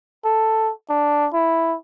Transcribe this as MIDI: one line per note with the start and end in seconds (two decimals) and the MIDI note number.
0.25 0.71 69
0.90 1.27 62
1.33 1.75 64